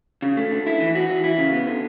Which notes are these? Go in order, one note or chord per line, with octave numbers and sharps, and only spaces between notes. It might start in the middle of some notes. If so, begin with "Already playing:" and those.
C#3
A3
D3
E4
E3
F#4
E3
E4
C#3
B3
D3